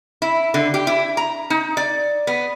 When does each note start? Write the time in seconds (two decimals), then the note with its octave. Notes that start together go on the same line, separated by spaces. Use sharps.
0.22 E4
0.54 D3
0.74 G4
0.87 E4
1.17 A#5
1.50 D#4
1.77 D5
2.27 B3